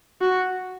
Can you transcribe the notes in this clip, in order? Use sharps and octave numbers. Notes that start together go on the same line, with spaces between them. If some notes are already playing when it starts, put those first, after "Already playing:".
F#4